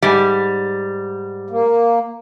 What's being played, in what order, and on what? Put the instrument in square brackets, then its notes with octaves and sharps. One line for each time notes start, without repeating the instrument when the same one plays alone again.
[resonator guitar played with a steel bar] G#2 G3
[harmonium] A#3